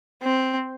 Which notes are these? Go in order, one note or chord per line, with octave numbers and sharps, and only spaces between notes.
C4